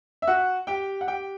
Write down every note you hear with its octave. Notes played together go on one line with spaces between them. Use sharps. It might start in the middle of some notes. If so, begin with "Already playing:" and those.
E5
F#4 F#5
G4 G5
F#5
G4 G5